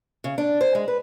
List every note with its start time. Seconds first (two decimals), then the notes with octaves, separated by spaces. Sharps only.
0.24 C#3
0.38 D4
0.61 C5
0.75 G#3
0.88 B4